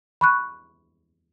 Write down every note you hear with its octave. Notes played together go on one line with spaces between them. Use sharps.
B5 C#6 F#6